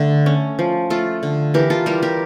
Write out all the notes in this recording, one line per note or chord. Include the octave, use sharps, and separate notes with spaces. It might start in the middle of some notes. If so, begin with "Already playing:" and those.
Already playing: D3 A3
C#4
F3
A3 F4 A4
D3
E3 G4 A#4
F4 A4
G3 G4 A#4
G4 A#4